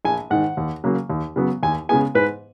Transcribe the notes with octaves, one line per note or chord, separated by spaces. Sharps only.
A#1 G#5
G#2 D#3 F#5
D#2
C#3 F#3 A#3
D#2
C#3 F#3 B3
D#2 G#5
C#3 G#3 B3 G#5
G#2 B4